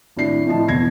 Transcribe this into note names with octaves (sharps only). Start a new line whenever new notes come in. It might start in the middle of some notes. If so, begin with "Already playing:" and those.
G#1 A2 D4 C7
A2 F3 D#5 A5
E1 E2 G#6 A#6 C7